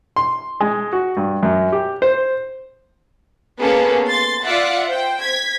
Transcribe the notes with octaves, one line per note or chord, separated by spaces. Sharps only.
C6
G#3
F#4
G2
F#2
G4
C5
A#3 B3 C#4 G#4 A4
C6 A6
F4 D5 E5 F#5
C5 G5
G#6 B6